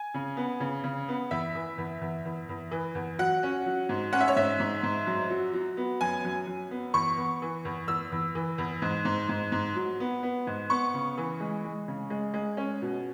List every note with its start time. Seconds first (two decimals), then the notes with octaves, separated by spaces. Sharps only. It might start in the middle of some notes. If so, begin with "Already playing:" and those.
Already playing: G#5
0.14 C#3
0.37 B3
0.60 C#3
0.84 C#3
1.08 B3
1.31 E2 E5
1.55 E3
1.78 E2
2.01 E2
2.25 E2
2.49 E2
2.71 E3
2.95 E2
3.19 F#3 F#5
3.43 C#4
3.66 F#3
3.89 G#2
4.13 C#4 F#5
4.20 E5
4.28 C#5
4.36 G#2 E5
4.60 G#2
4.83 G#2
5.07 F#2
5.30 F#3
5.53 F#3
5.77 B3
6.01 F#2 G#5
6.25 F#2
6.47 F#2
6.71 B3
6.94 E2 C#6
7.17 B3
7.42 E3
7.65 E2
7.88 E2 E6
8.12 E2
8.35 E3
8.58 E2
8.82 G#2
9.05 G#2
9.29 G#2
9.52 G#2
9.75 F#3
10.00 B3
10.23 B3
10.47 G#2
10.70 B3 C#6
10.94 C#3
11.18 E3
11.40 G#3
11.64 G#3
11.88 C#3
12.10 G#3
12.34 G#3
12.57 C#4
12.82 B2